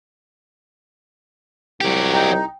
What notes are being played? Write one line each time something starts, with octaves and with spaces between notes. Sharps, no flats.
C2 F#3 G4
D#4 G5